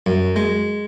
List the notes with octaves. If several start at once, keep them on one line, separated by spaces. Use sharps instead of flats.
F#2
G#3